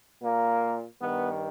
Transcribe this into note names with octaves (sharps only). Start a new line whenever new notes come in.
A#2 A#3
G2 D#3 B3